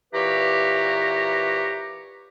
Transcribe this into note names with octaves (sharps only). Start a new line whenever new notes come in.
A#2 E3 G4 B4 C#5 A#5